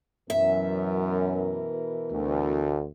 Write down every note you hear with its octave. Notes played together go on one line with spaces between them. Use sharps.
F#2 B2 E3 A#4 E5
D2